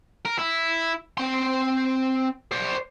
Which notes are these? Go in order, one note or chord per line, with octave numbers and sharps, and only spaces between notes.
A#4
E4
C4 C6
C5 D5